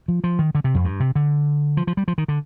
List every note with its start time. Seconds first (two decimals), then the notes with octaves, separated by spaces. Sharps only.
0.08 F3
0.24 F3
0.39 D#3
0.55 D3
0.64 C3
0.75 F2
0.85 G2
1.00 C3
1.15 D3
1.77 F3
1.87 F3
1.97 G3
2.08 F3
2.18 D#3
2.28 D3